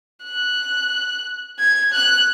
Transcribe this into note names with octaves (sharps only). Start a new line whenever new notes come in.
F#6
G#6
F#6